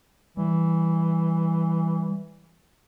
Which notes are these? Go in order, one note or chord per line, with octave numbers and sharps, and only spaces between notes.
E3 G3